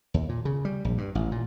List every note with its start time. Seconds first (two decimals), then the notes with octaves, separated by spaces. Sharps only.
0.14 D#2
0.29 A#2
0.45 C#3
0.65 G3
0.85 A#1
0.98 G2
1.15 A1
1.32 A#2